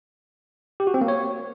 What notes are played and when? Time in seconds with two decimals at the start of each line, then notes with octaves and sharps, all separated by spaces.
0.80 G4
0.87 F#4
0.94 C4
1.01 A#3
1.08 C#5